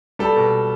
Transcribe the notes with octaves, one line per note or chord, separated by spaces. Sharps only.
G3 A4
B2